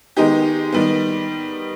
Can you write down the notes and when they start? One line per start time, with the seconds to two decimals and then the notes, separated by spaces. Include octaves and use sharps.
0.17 D#3 G#3 B3 D#4 G4
0.72 D#3 G3 B3